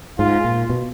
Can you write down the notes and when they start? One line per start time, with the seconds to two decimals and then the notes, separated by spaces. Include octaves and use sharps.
0.19 G#2 F4
0.44 A#2
0.70 B2